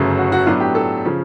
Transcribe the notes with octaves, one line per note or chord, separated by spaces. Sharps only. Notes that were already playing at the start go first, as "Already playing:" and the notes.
Already playing: G1 F#2 C#3 F#3 A3
F#4
F#4
A2 F#3 B3 D4 F4
G4
A4
C#3 F3